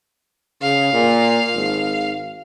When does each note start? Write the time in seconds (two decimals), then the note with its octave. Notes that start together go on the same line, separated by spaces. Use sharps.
0.62 C#3 F5
0.93 A#2
1.55 G#1